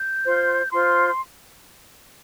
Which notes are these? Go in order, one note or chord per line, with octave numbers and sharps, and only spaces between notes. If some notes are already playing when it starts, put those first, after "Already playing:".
Already playing: G6
F4 C5
F4 C5 C6